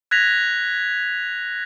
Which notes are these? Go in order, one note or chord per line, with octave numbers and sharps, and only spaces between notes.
F#6 G#6 A#6 B6 F7